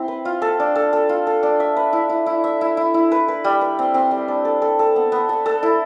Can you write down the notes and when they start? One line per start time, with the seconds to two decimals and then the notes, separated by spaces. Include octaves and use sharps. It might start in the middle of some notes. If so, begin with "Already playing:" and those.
Already playing: C4 E4
0.08 B4
0.25 F4
0.42 A4
0.60 D4
0.75 A4
0.93 A4
1.09 F4
1.27 A4
1.43 D4
1.60 E5
1.77 B4
1.93 E4
2.10 E4
2.26 E4
2.44 E5
2.61 E4
2.77 E4
2.94 E4
3.12 B4
3.28 B4
3.44 G3
3.61 B4
3.79 C4
3.94 C4
4.11 G3
4.28 D4
4.45 A4
4.62 A4
4.79 A4
4.96 B3
5.12 B3
5.29 A4
5.46 A4
5.63 E4